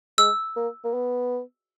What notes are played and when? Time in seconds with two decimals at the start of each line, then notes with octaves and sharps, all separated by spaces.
0.18 G#3 E6
0.56 A#3
0.85 A#3
0.94 B3